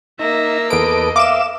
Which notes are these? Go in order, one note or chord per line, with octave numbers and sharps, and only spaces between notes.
A#3 D#4 E5 A#6
E2 A4 B4 D#5 D7
E5 F5 D6 E7